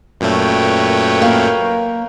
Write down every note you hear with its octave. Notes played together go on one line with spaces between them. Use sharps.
F#2 A#2 A3 B4 C#5 G5
A#3 A#4